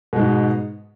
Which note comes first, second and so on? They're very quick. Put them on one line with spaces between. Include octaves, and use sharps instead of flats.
B2 G#3 G#2